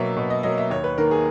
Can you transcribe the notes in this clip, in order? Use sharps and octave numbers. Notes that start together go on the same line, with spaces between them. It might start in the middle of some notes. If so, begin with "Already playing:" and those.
Already playing: B2 F#3 A#3 E5
B2
D#5
F#3 A#3 D#5
E5
D#2 C#5
B4
D#3 A#3 A#4
G#4